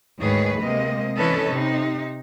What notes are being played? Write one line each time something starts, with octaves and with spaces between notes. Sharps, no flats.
D2 G#2 D#3 G#4 B4 C#5
C3 G#3 A#3 D#5
E3 C#4 D4 A4 B4 D#5
C3 D#4